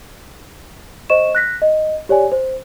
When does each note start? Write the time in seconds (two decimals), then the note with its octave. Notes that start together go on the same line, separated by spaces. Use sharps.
1.10 C5 D#5 C#6 E7
1.35 F#6 A#6 B6
1.62 D#5
2.09 G4 C#5 D5 G#5
2.32 C5